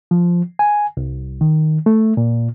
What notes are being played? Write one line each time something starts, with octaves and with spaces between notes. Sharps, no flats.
F3
G#5
C2
D#3
A3
A#2